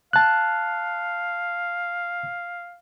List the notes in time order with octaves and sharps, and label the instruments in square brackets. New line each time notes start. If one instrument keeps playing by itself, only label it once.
[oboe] F5 [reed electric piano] A5 F#6